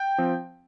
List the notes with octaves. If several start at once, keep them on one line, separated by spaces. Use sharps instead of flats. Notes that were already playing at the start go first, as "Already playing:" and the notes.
Already playing: G5
F3 C4